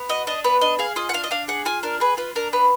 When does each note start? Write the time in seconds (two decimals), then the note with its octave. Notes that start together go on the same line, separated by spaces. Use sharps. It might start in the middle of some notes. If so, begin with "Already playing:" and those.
Already playing: B3
0.09 F#4 D#5
0.27 D4 D#5
0.44 B3 B4
0.61 D4 D#5
0.79 G#4 F5
0.96 F4 D#5
1.09 F#5
1.14 D4 F5
1.24 D#5
1.31 D4 F5
1.48 G#4 F#5
1.65 F4 G#5
1.83 D4 A#4
2.00 G#4 B4
2.17 F4 B4
2.35 D4 A#4
2.53 B3 B4